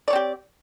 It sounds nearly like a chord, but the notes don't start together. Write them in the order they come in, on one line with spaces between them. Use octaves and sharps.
D5 C#5 C4 G4